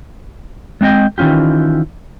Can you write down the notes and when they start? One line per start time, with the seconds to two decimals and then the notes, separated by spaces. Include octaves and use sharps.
0.81 G#3 C4 D4 D#5 G5
1.18 D#3 E3 C#4 F4 G4